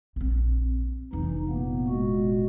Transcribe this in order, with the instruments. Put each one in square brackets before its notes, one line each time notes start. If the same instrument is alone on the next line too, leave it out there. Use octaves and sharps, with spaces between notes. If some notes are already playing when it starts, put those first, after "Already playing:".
[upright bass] A#1 C4
[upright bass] F1 D4 [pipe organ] E3 D#4
[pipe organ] A#2 A#3 B3
A#2 G#3 F#4